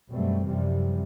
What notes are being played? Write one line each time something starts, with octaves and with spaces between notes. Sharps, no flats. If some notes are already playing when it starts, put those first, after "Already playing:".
F#2 B2 F#3 G3 A3 C4
F#2 C3 E3 F3 G3